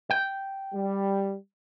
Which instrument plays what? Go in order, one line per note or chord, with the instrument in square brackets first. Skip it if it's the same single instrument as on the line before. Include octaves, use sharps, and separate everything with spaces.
[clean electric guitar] G5
[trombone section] G3